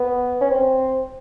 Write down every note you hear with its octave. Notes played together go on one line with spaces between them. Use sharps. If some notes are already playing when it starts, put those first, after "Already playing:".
Already playing: B3
C#4
C4